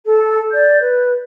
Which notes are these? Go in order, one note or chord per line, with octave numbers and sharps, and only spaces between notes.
A4
D5 G6
B4